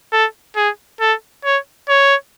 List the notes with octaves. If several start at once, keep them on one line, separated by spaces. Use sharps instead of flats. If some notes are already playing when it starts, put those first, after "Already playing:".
A4
G#4
A4
C#5
C#5